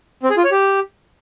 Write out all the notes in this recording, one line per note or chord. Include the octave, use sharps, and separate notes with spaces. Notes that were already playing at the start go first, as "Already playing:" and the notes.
C4
G#4
F4
C#5
G4